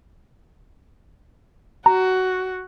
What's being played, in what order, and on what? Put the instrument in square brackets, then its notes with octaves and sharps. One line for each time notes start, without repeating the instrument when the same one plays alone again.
[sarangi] F#4 [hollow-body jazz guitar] A#5